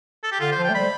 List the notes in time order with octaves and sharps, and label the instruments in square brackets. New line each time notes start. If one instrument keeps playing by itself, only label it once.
[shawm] A4
G4
[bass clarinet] D3 [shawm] F4
[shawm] C5
[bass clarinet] F3
[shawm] G5
[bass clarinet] A3
[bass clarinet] G3 [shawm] B5